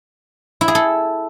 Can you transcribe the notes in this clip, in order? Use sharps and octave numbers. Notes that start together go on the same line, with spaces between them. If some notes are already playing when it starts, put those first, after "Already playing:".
E4
G#4
A4